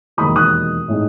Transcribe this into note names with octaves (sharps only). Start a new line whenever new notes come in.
E1 D#2 D#3 F#3 B5 D#6
D#6 F#6
A2 G#3 D#4